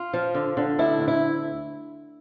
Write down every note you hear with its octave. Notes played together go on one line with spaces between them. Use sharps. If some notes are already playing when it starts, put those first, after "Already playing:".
Already playing: F4
F3
D3
D3
D2 E4
D2
E4